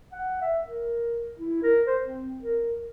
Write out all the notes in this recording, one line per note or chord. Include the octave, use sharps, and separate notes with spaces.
F#5
E5
A#4
E4
A#4
C5
C4
A#4